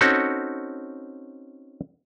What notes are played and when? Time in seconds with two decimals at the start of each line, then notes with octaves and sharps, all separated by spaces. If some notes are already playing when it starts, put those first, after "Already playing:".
0.01 C4 C#4 D#4 F#4 A4